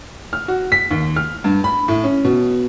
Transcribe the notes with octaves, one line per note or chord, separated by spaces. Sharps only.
F6
F#4
B6
D#2
F6
G2
B5
A2
C#4
B2